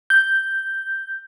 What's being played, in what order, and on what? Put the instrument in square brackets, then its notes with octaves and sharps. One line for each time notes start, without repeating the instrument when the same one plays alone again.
[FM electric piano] G6